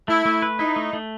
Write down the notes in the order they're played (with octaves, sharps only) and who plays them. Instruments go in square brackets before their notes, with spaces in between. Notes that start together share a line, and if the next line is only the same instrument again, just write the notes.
[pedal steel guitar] A3 [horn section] E4
[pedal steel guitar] A3
B4
[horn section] D#4 [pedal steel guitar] E4
[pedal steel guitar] A3
A3